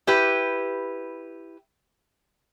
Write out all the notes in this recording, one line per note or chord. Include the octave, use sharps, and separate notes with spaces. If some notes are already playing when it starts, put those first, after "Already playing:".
E4 G4 B4